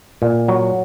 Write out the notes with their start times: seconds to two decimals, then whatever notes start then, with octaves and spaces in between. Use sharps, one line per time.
0.22 A#2
0.48 F#3